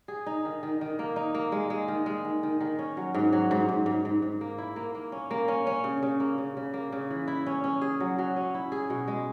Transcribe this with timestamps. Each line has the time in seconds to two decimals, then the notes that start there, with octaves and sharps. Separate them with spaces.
0.08 G#4
0.26 D#4
0.45 D#3
0.63 D#3
0.81 D#3
0.99 A#3
1.16 D#4
1.35 A#3
1.52 G#3
1.70 G#3
1.88 D#3
2.06 G#3
2.25 D#3
2.43 D#3
2.61 D#3
2.79 C#4
2.97 F#3
3.15 G#2
3.33 F#3
3.51 G#2
3.69 G#2
3.86 G#2
4.05 G#2
4.22 G#2
4.41 A#3
4.58 E4
4.76 A#3
4.95 A#3
5.12 C#4
5.31 A#3
5.48 C#4
5.67 C#4
5.84 C#3
6.03 C#3
6.20 A#3
6.38 C#3
6.57 C#3
6.74 A#3
6.92 C#3
7.10 E3
7.28 E4
7.46 C#4
7.64 C#4
7.81 G#4
8.00 F#3
8.19 F#3
8.36 C#4
8.55 E4
8.72 G#4
8.90 B2
9.08 G#3